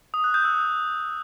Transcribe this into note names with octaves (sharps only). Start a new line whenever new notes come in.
D#6
F#6
G6
E6